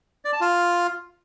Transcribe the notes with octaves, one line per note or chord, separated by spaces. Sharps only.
D5
A5
F4